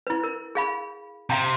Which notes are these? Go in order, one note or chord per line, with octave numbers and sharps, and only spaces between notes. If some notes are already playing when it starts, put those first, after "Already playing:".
E4 B4
A#4
G#4 F5 B5
C3 F5 G5 A#5